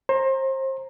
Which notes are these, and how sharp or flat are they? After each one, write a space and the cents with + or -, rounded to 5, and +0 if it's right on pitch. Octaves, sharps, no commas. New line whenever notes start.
C5 +30 A#5 +0